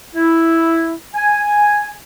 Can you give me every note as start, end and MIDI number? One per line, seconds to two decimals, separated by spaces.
0.15 0.93 64
1.15 1.92 80